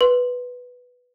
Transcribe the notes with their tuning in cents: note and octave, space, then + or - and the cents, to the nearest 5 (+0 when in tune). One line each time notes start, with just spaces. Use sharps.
B4 +0 C6 +0